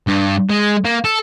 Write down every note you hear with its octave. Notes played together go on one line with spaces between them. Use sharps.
G2
G#3
A#3
A4